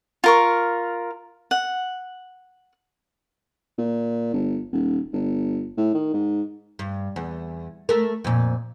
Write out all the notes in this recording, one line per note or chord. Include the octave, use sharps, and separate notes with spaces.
F4 A#4 C#6
F#5
A#2
G1
D#1
G1
A2
D#3
G#2
G2
E2
A3 A#4
F2 A#2